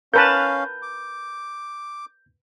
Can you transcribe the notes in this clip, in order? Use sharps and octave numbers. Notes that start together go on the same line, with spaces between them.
C#4 A#4 B4 F5 A5 G6
D6